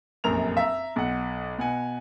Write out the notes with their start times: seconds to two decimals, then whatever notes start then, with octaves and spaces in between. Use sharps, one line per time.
0.24 F1 A#1 F#2 A#4 A#5 F7
0.57 E5 A#5
0.96 B1 F#5
1.58 B2 F#5 G#5